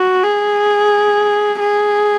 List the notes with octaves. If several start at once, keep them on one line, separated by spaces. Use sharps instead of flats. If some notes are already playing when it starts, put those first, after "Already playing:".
Already playing: F#4
G#4
G#4